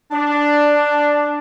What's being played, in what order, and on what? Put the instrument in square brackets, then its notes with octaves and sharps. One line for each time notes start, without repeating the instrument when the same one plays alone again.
[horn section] D4